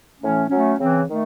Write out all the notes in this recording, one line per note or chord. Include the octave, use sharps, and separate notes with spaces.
A2 E3 A3 C#4
F#3 A3 C#4
C#3 E3 C4
D#3 A3